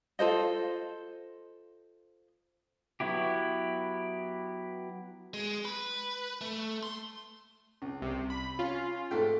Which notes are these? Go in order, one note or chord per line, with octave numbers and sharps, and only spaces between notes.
F4 A4 C5 D#5
F#3 B3 E4 G4
G#3
B4
A3
C6
C#2
C2 C3
B5
C#4 F4
G#2 A3 G5